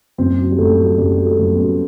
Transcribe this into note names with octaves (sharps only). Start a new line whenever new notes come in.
F#1 C4
F#3
G3
F#1 A3
F#2
F#1 G3
F#3
A3
F#1
B3
F#2